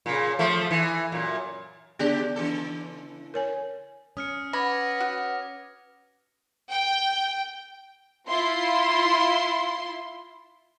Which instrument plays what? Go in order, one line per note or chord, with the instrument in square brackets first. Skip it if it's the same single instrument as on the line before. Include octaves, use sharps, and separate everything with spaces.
[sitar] A#2 C#3
F3 A3
E3
F#2 A#2
[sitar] C#3 G4 [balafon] B3 G#4 D5
[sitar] C#3 E3 A4
[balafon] A#4 C#5 G#5
[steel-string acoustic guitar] C#4 [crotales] D#6 F6 C#7
[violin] B4 F#5 [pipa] B5 [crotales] D6 G#6 A#6
[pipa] F#4
[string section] G5
[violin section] E4 F4 C6